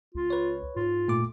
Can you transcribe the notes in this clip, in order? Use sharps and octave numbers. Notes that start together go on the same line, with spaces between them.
C#2 F4
B4 C#5
G#2 F4
A#2 A3 D6